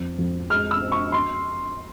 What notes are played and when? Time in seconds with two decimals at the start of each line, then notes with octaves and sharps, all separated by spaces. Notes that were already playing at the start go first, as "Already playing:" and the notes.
Already playing: F2 C4
0.18 F2
0.50 G#3 F6
0.71 E6
0.81 C4
0.92 C#6
1.12 C6